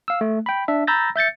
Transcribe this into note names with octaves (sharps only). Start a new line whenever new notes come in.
F5 E6
A3
G5 B5
D4 E5
A#5 B5 E6 G6 A6 A#6
E5 G6 A6 C#7